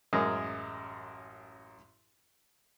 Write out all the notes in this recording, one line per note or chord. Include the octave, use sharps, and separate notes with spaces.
A1 F#2 G#3 A#4